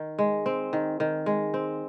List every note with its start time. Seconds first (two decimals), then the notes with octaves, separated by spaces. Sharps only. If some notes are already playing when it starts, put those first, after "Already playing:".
Already playing: D#3
0.19 G#3
0.46 C4
0.73 D#3
1.00 D#3
1.26 G#3
1.54 C4